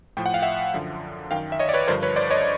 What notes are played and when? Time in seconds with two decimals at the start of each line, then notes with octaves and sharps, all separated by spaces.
0.17 A2 F3 G5
0.26 F#5
0.34 F5
0.42 E5 F#5
0.74 F#2 D3 F3
1.31 F#2 D#3 F5 G5
1.52 E5
1.59 C#5 D#5
1.69 D5
1.74 B4 C#5
1.88 G2 D3 F3 A#4 C5
2.03 B4 C#5
2.16 C5 D5
2.31 C#5 D#5